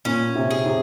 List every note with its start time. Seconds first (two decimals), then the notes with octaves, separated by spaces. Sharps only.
0.05 A#2 C#4
0.35 C3
0.51 G#4
0.66 C3